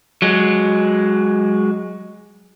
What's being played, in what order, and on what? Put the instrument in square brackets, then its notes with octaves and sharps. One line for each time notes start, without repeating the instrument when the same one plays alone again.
[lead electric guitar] F#3 G#3